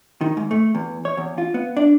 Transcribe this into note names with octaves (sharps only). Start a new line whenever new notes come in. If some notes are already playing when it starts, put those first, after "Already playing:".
D#3
G#2
A3
E2
C#5
E2
F4
B3
D4